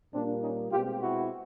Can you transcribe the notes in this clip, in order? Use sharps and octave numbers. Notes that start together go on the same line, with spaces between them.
A#2 G3 A#3 C4 D4
C#4 D#4
B2 G#3 C4 F4 G4
E4 F#4